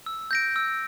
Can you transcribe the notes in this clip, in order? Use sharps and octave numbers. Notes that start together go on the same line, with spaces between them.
E6
G6 A#6 D7
E6